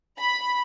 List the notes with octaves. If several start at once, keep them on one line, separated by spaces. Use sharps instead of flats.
B5